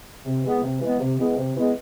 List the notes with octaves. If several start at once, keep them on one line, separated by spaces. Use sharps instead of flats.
C3
E3 G#3 B3
C3
E3 G#3 B3
C3
E3 G#3 B3
C3
E3 G#3 B3